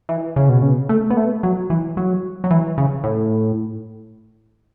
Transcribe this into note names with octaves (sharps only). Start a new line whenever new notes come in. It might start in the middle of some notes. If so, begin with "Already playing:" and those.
E3
C#3
B2
C#3
A3
B3
A3
F#3
E3
F#3
F#3
E3
C#3
A2